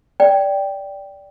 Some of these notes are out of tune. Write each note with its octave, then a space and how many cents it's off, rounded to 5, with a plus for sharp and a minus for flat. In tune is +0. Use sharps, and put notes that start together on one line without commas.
D5 -10 G5 +0